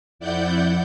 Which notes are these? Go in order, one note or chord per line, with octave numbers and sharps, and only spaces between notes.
F2 E4 D5 F#5 G6